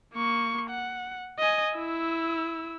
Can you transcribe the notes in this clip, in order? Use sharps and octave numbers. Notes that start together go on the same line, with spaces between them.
A#3 C#6
F#5
D#5 G#5
E4 E6